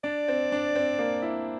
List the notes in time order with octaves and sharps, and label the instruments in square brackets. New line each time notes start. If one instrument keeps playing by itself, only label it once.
[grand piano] D4 [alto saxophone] D5
[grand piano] C4
D4
C4
A#3
E4